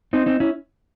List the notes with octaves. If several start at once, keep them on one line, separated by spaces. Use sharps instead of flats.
C4 D#4
C4 D#4
C#4 E4